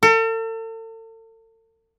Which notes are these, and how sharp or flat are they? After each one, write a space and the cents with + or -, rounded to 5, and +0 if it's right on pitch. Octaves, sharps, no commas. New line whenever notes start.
A4 +40